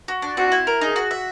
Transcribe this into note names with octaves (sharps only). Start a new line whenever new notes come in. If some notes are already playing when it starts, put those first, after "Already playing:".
F#4
D4
C4 F#4
E4
A#4
D#4 G#4
F#4
E5